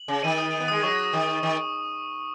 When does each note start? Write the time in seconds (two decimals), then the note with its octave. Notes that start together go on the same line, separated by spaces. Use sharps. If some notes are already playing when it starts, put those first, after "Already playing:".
Already playing: F#7
0.08 C#3
0.23 D#3 D#7
0.38 D#6
0.53 D#6
0.60 B3
0.68 G#3 D#6
0.83 F#3 C#6
1.13 D#3
1.43 D#3